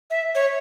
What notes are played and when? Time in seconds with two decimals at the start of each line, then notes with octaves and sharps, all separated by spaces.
0.10 E5
0.35 C#5